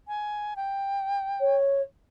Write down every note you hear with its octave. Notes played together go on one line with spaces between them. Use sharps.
G#5
G5
C#5